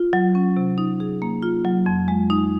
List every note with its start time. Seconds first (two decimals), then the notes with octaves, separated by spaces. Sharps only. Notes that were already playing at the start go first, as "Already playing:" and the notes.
Already playing: F4
0.13 F#3
0.35 C#4
0.57 C3
0.78 D#4
1.00 G#4
1.22 A#3
1.43 F4
1.65 F#3
1.86 F2
2.08 G#3
2.30 D#4